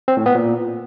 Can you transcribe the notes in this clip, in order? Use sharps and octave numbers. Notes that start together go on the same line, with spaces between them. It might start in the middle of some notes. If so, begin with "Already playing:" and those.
C4
A2
B3
A#2